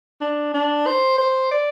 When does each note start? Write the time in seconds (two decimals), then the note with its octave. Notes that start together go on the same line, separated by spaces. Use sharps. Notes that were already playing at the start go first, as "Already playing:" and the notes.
0.21 D4
0.54 D4
0.87 C5
1.18 C5
1.51 D5